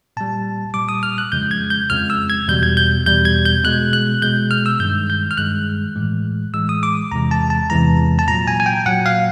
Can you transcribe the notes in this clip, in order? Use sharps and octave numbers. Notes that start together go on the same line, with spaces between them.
A#2 G3 A5
A#2 G3 D6
D#6
F6
F#6
F2 C#3 F3 G#3 G6
G#6
G6
F2 C#3 F3 G#3 F6
E6
G#6
E2 B2 G3 G6
G#6
G6
E2 B2 G3 G6
G#6
G6
B2 G#3 F#6
F#6
B2 G#3 G6
F6
E6
G2 D#3 G#3 G6
G6
F6
G2 D#3 G#3 F#6
A2 E3 G#3
A2 E3 G#3 E6
D#6
D6
E2 C3 E3 G#3 A#5
A5
A5
E2 C3 E3 G#3 A#5
A5
A#2 F#3 A#5
G#5
G#5
G5
A#2 F#3 F#5
F5